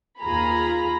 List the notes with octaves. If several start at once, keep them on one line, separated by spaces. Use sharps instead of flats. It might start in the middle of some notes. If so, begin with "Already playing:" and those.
D#2 F4 G#4 A#5 B5